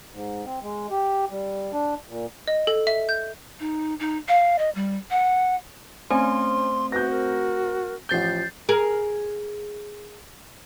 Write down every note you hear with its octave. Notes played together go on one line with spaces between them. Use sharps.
G#2
C4
G#3
G4
G3
D4
A#2
D#5
A4
E5
G6
D#4
D#4
F5
D#5
G3
F#5
A3 C4 C#4 C5 G#5 C6
F#4 B4 G6 A#6
A#4
A1 F3 G6 A6 C7 G7
G#4 A#4